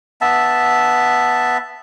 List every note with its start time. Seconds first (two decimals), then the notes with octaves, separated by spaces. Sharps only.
0.21 B3 E5 A5